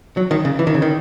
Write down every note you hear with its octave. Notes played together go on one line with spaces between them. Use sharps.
F#3
D#3
C#3
E3
D#3
C#3
D#3